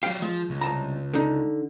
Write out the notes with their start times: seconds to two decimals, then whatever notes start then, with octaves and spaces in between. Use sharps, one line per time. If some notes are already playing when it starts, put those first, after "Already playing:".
0.03 F#3 G4 F5 G5
0.22 F3 G#3
0.50 C#2
0.61 C2 A5 A#5
1.14 D3 D#4